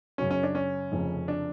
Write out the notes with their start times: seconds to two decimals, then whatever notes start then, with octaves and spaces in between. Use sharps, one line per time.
0.18 F#2 C#3 F#3 C#4
0.31 C#4
0.43 D4
0.55 C#4
0.92 F1 F2 C#3 F3
1.28 D4